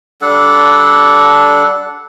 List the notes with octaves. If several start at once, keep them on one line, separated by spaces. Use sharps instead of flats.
G3 D4 A4 F#5